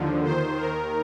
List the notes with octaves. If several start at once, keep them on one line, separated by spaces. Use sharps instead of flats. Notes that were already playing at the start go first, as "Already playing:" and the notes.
Already playing: D#2 D3 F3
D#2 D#3 C5
D#2 D#3 A#4